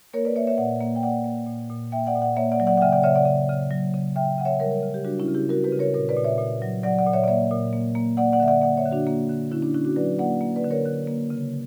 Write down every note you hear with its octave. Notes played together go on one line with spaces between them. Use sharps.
A#3 A#4 C#5
B4 D5
A#3 C#5 E5
C#5 E5
A#2 D5 F#5
A#3
G5
A#3 D5 F#5
A#3
A#2
A#2
A#3 E5 G5
D5 F#5
A#2
D5 F#5
A#3 C#5 E5
D5 F#5
F#3
D5 F#5
F#5
C#3 E5 G5
D5 F#5
C#3 C#5 E5
D5 F#5
C#3
C#3
F#3
C#3
C#3 E5 G5
C#3 F#5
C#5 E5
G3 A#4 C#5
A#4 C#5
C#3
G4
G3 D4 F#4
C#4 E4
C#3
E4 G4
G3 F#4 A#4
G4 B4
C#3
A#4 C#5
A#2 A#4 C#5
B4 D5
A#2
C#5 E5
A#2
F#3
F#3 D5 F#5
D5 F#5
A#2
C#5 E5
D5
A#3 C#5 E5
A#2
A#3
A#3
A#3 D5 F#5
D5 F#5
D3 E5
D5 F#5
A#3 D5 F#5
C#5 E5
D3
D4 F#4
A#3
D3
D3 C#4 E4
D4
D3 C#4 E4
D4 F#4
F#3 B4 D5
A#3 D5 F#5
A#3
B4 D5
D3
A#4 C#5
D3
A#3
C#3